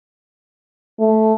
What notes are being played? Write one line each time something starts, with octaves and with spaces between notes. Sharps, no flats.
A3